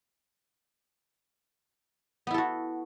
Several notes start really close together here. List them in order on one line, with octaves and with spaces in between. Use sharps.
B3 E4 A4 F#4